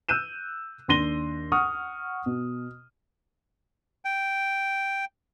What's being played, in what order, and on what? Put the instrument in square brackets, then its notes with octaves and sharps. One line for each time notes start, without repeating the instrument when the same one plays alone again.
[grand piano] E6 F#6 G6 D#7 E7
D#2 D4 C6 A#6 D#7 G7
F#5 C#6 D#6 F6
B2
[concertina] G5